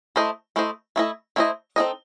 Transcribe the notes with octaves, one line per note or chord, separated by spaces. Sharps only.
A3 E4 A4 C5 D#5
A3 E4 A4 C5 D#5
A3 E4 A4 C5 D#5
A3 E4 A4 C5 D#5
C4 D#4 A4 D#5